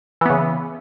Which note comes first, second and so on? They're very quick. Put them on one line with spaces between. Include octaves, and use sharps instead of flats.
E3 B3 C#3